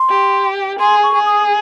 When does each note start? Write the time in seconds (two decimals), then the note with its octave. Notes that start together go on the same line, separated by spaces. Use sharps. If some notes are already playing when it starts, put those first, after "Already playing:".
Already playing: C6
0.09 G4
0.79 G#4 C6
1.03 C#6
1.14 G#4
1.26 D#6